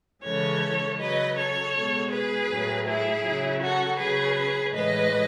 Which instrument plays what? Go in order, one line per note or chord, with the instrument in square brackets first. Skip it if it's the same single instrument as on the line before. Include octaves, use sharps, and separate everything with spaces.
[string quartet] C#3 E3 G#3 A4 C#5
C#3 F#3 B4 D#5
A4 C#5
B2 G#3
G#4 B4
A2 F#3
E4 G#4
C#3 F#3
F#4 A4
C#3 F#3 G#4 B4
A2 E3 G#3 B4 D#5